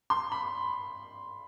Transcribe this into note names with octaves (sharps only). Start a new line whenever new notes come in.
C6
B5